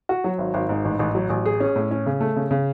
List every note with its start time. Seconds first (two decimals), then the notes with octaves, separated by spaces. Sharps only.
0.09 F#4
0.24 F#3
0.38 G#1
0.54 G#1
0.69 G#2
0.85 A1
0.99 A1
1.15 F#3
1.30 A1
1.46 G#4
1.60 C#4
1.76 A2
1.91 C#4
2.06 C#3
2.20 A3
2.36 C#3
2.51 C#3